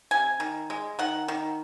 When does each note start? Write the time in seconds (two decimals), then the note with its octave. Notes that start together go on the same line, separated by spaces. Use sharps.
0.11 C3 G#5
0.40 D#3
0.70 G#3
0.99 D#3 F#5
1.28 D#3